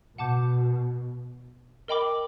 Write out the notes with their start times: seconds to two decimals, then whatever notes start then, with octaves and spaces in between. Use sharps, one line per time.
0.18 B2 F#5 A5 D6 G6
1.88 A#4 D#5 G5 B5 D6